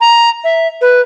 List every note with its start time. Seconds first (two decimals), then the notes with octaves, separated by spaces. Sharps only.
0.01 A#5
0.44 E5
0.81 B4